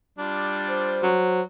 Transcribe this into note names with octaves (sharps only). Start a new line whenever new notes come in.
G3 D4 F4
C5
F#3